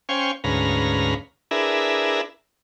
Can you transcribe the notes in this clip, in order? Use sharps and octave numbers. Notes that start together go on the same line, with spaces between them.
C#4 C5 F5 G5 G#5 C#6
D2 G#2 C#4 B4 F5 A#5
D4 E4 G#4 A#4 B4 E5